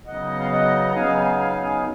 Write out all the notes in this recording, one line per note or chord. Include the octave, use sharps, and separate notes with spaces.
C#3 F#3 B3 D#4 D#5 F#5
F5
D#5 F#5
A#5
C#3 F#3 B3 D#4 F5 G#5
F5 G#5
F5 G#5
F5 G#5